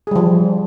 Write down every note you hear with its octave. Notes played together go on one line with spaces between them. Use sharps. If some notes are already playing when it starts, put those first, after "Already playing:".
F3 G3 G#4